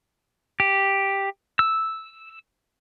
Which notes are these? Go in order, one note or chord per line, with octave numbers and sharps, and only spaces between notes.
G4
E6